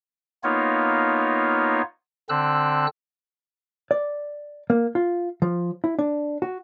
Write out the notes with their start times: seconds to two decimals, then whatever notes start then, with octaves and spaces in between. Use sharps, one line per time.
0.44 A#3 B3 D#4 F4 C#5
2.29 D3 C4 E6 F#6
3.91 D5
4.70 A#3
4.95 F4
5.42 F3
5.84 E4
5.99 D4
6.42 F#4